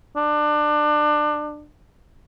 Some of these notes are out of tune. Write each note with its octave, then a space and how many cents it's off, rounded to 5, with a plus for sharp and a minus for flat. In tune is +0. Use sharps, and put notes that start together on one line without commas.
D4 +25